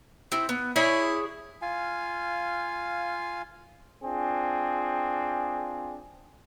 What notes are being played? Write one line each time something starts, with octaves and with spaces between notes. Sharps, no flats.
C4 E4
B3
E4 G#4 C#5 D5
F4 F5 G#5
C4 D4 F4 G#4